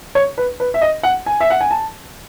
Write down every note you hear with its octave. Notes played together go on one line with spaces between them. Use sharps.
C#5
B4
B4
E5
D#5
F#5
G#5
E5
F#5
G#5
A5